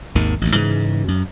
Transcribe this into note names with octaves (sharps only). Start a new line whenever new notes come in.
G#1 D#2 D#3
A1 D2
G#2 C#3 E3
F#2